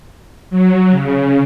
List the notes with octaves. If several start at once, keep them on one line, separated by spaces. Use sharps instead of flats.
F#3
C#3